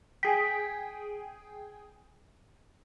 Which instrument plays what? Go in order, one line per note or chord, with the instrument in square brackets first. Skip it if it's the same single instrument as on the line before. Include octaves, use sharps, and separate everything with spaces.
[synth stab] G#4 G5 [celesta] B6